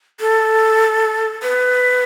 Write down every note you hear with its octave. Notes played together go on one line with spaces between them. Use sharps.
A4
B4